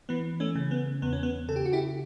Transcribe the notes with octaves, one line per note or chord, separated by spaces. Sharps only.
E3 B3
A3 C#4
C#3
B3
E2 B3
C#4
B3
C#3 A4
G4
F#4
E4 G4